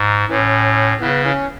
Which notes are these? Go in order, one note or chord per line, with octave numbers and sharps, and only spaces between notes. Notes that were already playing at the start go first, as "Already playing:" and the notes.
Already playing: G#2
A2 E3 C#4
C#3 E3 B3
E3 C#4